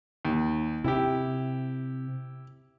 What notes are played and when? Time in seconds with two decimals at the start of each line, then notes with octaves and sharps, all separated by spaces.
0.25 D#2
0.84 C3 E4 G4